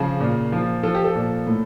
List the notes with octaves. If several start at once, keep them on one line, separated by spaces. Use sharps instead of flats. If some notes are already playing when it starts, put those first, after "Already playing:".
Already playing: C#3 F3
A#2
F3
F3 A4
G4
A4
A#2
A2